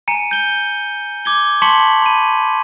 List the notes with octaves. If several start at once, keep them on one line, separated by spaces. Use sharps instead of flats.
G#5 A#5 C#7 D#7
G6 G7
D6 G#6 G7
A5 C6 C#6 B6 C#7 F#7
B5 D#7